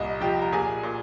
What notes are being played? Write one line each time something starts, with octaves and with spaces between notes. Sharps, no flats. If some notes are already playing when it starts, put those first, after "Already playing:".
Already playing: C2 A#2 D#5
F3 G4 G5
A#5
A#2 G#4 G#5
A#2